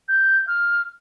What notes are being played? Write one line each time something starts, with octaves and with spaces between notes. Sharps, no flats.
G6
F6